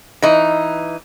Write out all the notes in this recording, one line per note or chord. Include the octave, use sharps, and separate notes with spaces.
E3 D#4